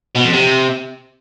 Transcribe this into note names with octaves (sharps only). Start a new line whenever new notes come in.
B2
F2
C3